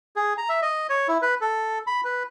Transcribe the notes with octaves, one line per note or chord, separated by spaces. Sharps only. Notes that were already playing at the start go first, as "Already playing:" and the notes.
G#4
A#5
E5
D#5
C#5
E4
B4
A4
B5
B4